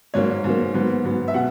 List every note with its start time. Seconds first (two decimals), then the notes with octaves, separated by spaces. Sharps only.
0.14 G#2 F#3 A#3 C#5
0.44 G#2 F#3 A#3
0.74 G#2 F#3 B3
1.05 G#2 F#3 B3
1.28 E5
1.34 B2 F#5